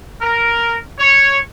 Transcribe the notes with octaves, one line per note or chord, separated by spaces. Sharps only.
A#4
C#5